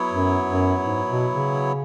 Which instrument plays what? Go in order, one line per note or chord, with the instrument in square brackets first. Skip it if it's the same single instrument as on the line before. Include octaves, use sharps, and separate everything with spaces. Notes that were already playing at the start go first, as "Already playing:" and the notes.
Already playing: [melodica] F#3 B3 E4 C#5
[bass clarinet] F#2
F#2
G#2
B2
C#3